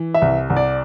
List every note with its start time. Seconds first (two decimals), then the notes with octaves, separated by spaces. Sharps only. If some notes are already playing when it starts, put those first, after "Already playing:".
Already playing: E3
0.14 E5
0.22 C2
0.50 C2
0.56 D5